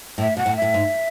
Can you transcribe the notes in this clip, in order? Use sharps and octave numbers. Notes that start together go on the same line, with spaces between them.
A2 E5
B2 F#5
A2
E5
A2
G#2